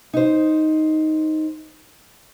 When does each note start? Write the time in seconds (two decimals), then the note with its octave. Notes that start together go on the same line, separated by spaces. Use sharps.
0.13 D#4 C5